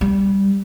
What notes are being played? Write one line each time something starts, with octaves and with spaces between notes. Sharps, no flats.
G3